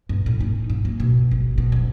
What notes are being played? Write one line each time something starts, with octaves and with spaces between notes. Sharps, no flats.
G2
A2
D#4
G#2
A#3
B2
G#1
B2
F#1